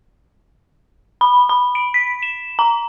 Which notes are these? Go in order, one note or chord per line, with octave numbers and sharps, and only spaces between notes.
B5
B5
D7
B6
E7
A#5